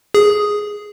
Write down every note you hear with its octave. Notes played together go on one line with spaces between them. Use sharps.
G#4